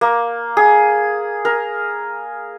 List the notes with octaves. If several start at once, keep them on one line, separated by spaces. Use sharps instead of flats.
A#3
G#4
A#4